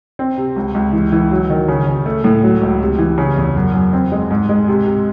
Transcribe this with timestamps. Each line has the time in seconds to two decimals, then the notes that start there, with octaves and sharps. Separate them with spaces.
0.19 C4
0.37 C3
0.56 C#2
0.74 C#2
0.93 E3
1.12 E3
1.31 F#3
1.50 D#3
1.68 C#3
1.87 C#3
2.06 A3
2.24 A2
2.43 F#3
2.61 C#2
2.81 C3
2.99 E3
3.18 C#3
3.37 E2
3.56 F#2
3.73 F#2
3.93 C4
4.12 G#3
4.31 G#2
4.49 G#3
4.68 C3
4.87 C3